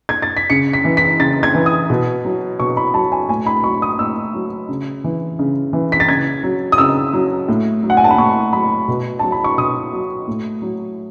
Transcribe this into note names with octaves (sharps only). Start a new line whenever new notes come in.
G#6
A6
B6
C#3 C#7
B6
E3
B6
C#3 A6
G#6
E3
D#6
B2
F#3
B2 C#6
B5
F#3 A5
G#5
A2 G#5
B5
F#3 C#6
D#6
A2 E6
F#3
C#3
E3
C#3
E3
B6
A6
C#3 G#6
F#3
D#6
C#3 E6
F#3
A2
F#3
F#5
G#5
A5
B5
A2 C#6
F#3 B5
B2
F#3 A5
B5
C#6
B2 D#6
F#3
A2
F#3